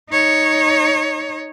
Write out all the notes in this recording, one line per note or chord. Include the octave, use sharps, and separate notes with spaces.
D#4 C#5